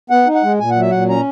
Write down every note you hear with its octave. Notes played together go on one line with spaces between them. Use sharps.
B3 F#5
D#4
F#5
G#3
A#2 G#5
F#5
F#3 E5
A#2 F#5
C#4 A#5